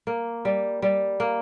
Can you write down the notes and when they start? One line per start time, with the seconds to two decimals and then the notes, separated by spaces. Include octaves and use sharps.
0.07 A#3
0.45 G3
0.82 G3
1.20 A#3